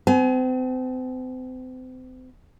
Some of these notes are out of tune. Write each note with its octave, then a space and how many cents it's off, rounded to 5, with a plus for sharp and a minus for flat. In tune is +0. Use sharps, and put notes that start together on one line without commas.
C4 -40 G#5 +35